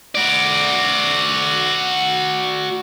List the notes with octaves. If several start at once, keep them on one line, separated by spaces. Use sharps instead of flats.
F#4 D5